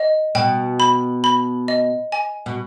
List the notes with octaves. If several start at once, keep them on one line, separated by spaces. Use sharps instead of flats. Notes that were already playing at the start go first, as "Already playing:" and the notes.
Already playing: D#5
B2 G5
B5
B5
D#5
G#5
B2